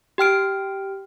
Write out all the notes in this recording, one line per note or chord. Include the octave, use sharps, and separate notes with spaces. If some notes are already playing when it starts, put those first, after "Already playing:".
G4 G5 F6 D7